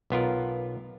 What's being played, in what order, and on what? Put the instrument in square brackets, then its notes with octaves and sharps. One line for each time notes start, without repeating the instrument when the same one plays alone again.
[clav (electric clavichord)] B1 B3 F4 A#4